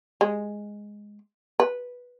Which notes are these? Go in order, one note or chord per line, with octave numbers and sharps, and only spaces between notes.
G#3
B4